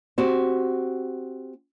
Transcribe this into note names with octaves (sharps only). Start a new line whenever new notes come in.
C4 F#4 G4